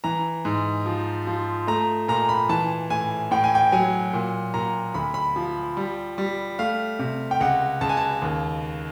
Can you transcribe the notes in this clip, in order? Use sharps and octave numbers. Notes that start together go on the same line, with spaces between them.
E3 A#5
G#2
F3
F3
A3 A#5
A#2 A#5
B5
E3 A5
A2 G#5
A2 G5
G#5
G5
F#3 G#5
A#2
A#2 A#5
D2 B5
B5
F3
G3
G3
A3 F5
C3
G5
C#2 F#5
C#2 A5
G#5
A5
D#2